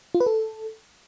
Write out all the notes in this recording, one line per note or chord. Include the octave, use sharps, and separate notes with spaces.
F4
B4
A4